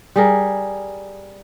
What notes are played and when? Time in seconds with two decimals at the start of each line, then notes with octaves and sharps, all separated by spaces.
0.16 G3 G#4 A#4